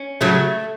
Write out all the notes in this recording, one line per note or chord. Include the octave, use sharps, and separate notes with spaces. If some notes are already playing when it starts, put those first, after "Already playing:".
Already playing: C#4
C#3 F#3 A3